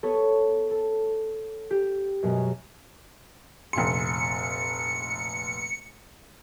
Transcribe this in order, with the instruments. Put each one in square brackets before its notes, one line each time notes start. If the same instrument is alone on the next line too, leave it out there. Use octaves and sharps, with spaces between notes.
[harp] B3 A4 B4 C#5
A4
G4
F#2 B2 G#3
[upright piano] F1 A#1 C6 [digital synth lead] C#7